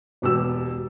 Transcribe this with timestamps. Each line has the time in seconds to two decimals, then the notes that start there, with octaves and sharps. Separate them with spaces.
0.22 E1 B2 G4 E6